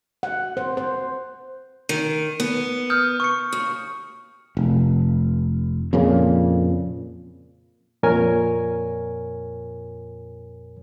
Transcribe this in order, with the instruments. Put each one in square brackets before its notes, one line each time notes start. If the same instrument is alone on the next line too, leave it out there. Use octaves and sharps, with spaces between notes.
[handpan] F#5
C5
C5
[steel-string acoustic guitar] D#3 [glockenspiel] D#7
[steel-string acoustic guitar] B3
[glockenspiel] D#6 F6 G6
C#6 C#7
[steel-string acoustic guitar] D#2
[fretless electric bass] F1
F2 A#2 C#3
[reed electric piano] F2 A#2 A#4 C#5 G#5